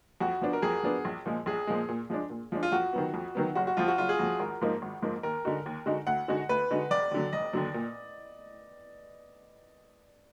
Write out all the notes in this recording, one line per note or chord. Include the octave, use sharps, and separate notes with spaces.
F2 F#4
F3 B3 D4
A#4
F2 G#4
F3 B3 D4
A#1
A#2 F3 G#3
A#1 G#4
A#2 F3 G#3
A#2
F3 G#3 D4
A#2
F3 G#3 D4
F4
F2 F#4
D#3 F#3 B3
F2
D#3 F#3 B3
F#1 F#4
F#4
F2 F3 F4
F#4
F#1 F4
G#4
F2 F3 F#4
G#1 A#4
G#2 F3 A#3 D#4
G#1
G#2 F3 A#3 D#4
D#2 A#4
D3 G#3 D#4 F#4
D#2
D3 G#3 D#4 F#4
D2 F#5
D3 G#3 D#4 F#4
D2 B4
D3 G#3 D#4 F#4
F1 D5
D#2 D3 F#3
F1 D#5
D#2 D3 F#3
A#2